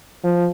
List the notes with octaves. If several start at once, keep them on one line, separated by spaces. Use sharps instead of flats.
F3